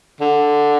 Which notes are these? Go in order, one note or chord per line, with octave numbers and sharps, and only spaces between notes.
D3